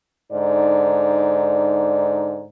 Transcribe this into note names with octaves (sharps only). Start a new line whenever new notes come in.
G#2 D3 D#4 D5